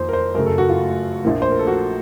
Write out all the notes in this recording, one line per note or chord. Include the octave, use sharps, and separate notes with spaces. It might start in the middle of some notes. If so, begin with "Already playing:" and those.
Already playing: F2 D#3 A#3 C5
A#4
C5
F#2 C#3 A3 A#4
A4
F#4
F4
A#1 A#2 F3 A#3
C5
A#4
A4
F#4